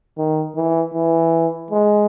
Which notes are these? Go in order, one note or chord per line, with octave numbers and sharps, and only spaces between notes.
D#3
E3
E3
G#3